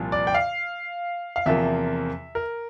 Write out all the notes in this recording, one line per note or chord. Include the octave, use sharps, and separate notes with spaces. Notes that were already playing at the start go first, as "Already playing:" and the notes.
Already playing: C2 A#2 F3
D5
G5
F5
F5
E2 C3 F3 A#3 E5
A#4